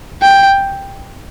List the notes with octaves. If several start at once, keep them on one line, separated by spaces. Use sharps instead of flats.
G5